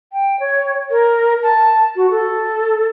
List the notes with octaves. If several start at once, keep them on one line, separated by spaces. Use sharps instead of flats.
G5
C#5
A#4
A5
F#4
A4